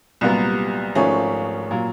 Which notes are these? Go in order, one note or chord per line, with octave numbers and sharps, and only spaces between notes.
C2 A#2 F#3 B3
G#1 G#2 F3 A3 C#4
A#2 F#3